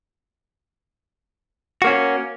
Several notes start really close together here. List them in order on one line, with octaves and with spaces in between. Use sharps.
F#4 A#3 C#4